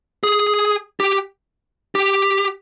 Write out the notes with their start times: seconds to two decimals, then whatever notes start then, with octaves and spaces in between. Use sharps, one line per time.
0.23 G#4
1.00 G4
1.95 G4